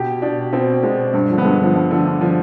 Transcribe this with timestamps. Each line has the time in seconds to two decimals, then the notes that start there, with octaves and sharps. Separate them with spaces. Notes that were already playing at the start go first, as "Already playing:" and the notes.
Already playing: B2 G4
0.22 B2 D4
0.53 B2 C4
0.83 B2 G#3
1.14 G2
1.30 D3 F3
1.38 B3
1.44 G2 G#3
1.60 D3 F3
1.75 G2
1.91 D3 F3
2.06 G2
2.21 D3 F3